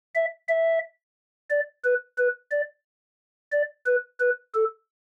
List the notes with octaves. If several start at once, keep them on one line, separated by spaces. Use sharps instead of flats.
E5
E5
D5
B4
B4
D5
D5
B4
B4
A4